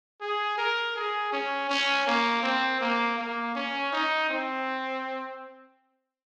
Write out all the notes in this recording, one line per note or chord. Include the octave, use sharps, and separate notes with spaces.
G#4
A#4
G#4
C#4
C#4
A#3
C4
A#3
A#3
C#4
D#4
C4